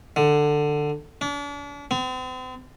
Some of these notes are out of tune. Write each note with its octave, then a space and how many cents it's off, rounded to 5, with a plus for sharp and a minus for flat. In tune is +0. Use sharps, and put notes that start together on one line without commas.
D3 +15
D4 -40
C4 -40